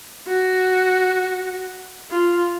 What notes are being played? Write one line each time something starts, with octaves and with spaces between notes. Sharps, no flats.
F#4
F4